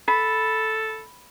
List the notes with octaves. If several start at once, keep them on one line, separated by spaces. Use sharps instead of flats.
A4 B5